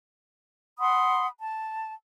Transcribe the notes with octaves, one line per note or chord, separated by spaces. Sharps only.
F#5 B5 C6 D#6
A5